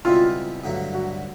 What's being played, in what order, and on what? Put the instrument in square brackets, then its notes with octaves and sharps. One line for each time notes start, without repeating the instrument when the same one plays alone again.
[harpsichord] C#2 B2 G3 C4 E4 [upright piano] F4
[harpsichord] G2 D3 F#3 A3
[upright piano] F#4